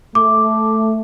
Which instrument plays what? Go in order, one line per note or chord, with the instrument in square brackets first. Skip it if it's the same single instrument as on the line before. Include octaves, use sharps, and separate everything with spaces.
[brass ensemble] A3 [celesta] D6